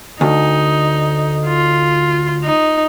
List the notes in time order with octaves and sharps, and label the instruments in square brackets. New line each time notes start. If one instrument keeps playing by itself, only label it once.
[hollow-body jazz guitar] D2 [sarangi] D#4
[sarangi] F4
D#4